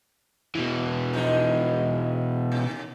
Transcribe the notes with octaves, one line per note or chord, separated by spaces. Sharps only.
B2 E3
F3 G#3 D#4
D#2 C3